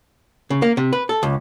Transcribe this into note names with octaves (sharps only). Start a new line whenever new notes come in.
C#3
A#3
C3
B4
A4
C#2